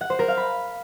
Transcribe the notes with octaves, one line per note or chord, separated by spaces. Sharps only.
F#5
C5
A#4
F5
B5